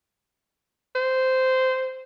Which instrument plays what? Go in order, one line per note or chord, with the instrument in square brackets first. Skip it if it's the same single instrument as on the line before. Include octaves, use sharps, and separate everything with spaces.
[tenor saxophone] C5